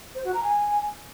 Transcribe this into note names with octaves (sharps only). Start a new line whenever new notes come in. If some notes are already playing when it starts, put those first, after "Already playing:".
C5
F#4
A#5
G#5